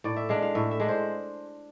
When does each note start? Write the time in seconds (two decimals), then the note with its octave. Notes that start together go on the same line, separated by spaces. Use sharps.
0.04 A2 D5
0.16 E5
0.29 G#3 D4 F5
0.42 F5
0.55 A2 E5
0.71 E5
0.80 G#3 D4
0.89 C5